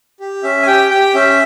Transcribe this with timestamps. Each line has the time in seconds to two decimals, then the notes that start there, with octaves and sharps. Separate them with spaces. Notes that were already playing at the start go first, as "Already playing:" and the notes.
0.20 G4
0.43 C#4 E5
0.62 G#5
0.67 G4 G5
0.91 G4 G5
1.15 C#4 E5